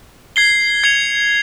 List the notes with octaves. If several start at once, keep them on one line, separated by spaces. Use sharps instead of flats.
G#6 C7 G7
G#6 C#7 F7